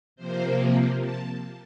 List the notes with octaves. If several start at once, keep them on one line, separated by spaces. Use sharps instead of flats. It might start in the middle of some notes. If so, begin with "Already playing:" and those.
C3 F3 A#3 C5
A5